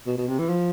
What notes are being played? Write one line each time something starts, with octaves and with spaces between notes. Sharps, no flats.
B2
B2
C3
E3
F3